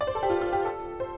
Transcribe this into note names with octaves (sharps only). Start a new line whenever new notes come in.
D5
C5
A4
G4
F4
F4
G4
A4
C5